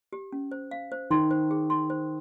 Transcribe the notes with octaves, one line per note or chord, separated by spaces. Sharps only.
G4
C#4
C5
F5
C5
D#3 C6
C5
G#4
C6
C5